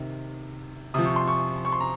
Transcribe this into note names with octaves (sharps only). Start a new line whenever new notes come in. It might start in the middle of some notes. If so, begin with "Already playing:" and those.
Already playing: C3 D#3
C3 F3 D#6
C#6
C6
C#6
C#6
C6
A#5